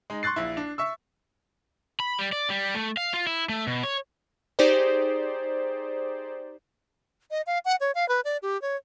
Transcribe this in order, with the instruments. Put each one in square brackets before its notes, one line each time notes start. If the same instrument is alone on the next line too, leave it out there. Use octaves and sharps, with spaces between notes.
[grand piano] G#3 D#4
C6 C#6 F#6 A6 C7
A#1 E4
D4
E5 C#6 E6
[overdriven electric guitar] B5
G3
D5
G3
A3
F5
F4
E4
A3
B2
C#5
[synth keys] D#4 G4 G#4 C5 D5
[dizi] D#5
F5
F#5
C#5
F5
B4
D5
G4
C#5